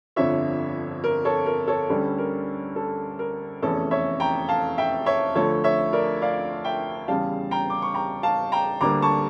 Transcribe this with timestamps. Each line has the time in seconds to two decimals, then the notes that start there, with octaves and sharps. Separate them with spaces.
0.16 G1 F2 D3 F3 C#5 E5
1.04 A#4
1.25 A4 C#5
1.46 A#4
1.68 A4 C#5
1.90 D2 D3 G3 C#4 A4
2.18 A#4
2.76 A4
3.19 A#4
3.62 F1 E2 E3 A3 C#4 A4 C#5
3.91 C#5 E5
4.20 G5 A#5
4.49 F5 A5
4.78 E5 G5
5.06 C#5 E5
5.35 D2 D3 F3 A3 A4 C#5
5.64 C#5 E5
5.93 A#4 D5
6.22 D5 F5
6.64 E5 G5
7.08 E2 C#3 G3 F5 A5
7.51 G5 A#5
7.70 D6
7.82 C#6
7.94 G5 A#5
8.23 F5 A5
8.52 G5 A#5
8.81 D2 D3 G3 A#3 A#5 D6
9.02 A5 C#6